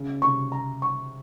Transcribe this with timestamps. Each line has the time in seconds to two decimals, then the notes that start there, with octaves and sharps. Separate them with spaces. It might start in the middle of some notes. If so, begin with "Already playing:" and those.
Already playing: C#3
0.22 C3 C#6
0.52 A#5
0.82 C#6